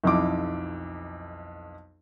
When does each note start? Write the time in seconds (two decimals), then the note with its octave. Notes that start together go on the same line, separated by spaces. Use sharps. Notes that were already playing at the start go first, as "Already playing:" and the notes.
0.04 B1 F2 E4 D6